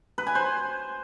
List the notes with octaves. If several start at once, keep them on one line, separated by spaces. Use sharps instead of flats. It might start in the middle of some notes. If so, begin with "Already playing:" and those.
B4
G#5
C5